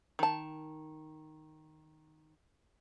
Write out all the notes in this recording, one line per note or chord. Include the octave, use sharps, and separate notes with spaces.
D#3 A5